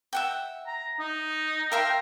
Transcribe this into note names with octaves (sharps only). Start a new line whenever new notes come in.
E5 F#5 G5
A#5
D#4
A#4 E5 F5 G5 C6